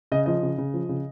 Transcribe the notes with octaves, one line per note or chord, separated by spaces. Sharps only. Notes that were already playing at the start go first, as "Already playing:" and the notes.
C#3 D#5
F3 D#5
C#3
C#3
F3
C#3